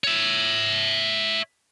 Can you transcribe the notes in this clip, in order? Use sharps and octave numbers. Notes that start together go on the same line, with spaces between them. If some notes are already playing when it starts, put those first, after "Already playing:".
C#5 E5